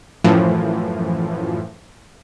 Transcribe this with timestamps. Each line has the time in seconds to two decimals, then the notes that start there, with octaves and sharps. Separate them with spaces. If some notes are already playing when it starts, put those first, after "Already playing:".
0.24 F#2 A2 E3 F3